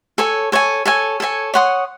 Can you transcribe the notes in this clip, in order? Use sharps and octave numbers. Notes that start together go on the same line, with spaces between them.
A4 C#5 G#5
A4 C#5 G#5
A4 C#5 G#5
A4 C#5 G#5
C#5 F#5 C6 D#6